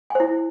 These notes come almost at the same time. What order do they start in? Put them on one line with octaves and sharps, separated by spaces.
G#5 C5 E4